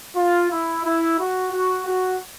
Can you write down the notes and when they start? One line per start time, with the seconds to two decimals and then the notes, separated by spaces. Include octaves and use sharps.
0.16 F4
0.50 E4
0.85 E4
1.18 F#4
1.52 F#4
1.87 F#4